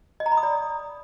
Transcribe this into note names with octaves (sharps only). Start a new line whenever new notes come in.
D#5
A#5
B5
D#6
D5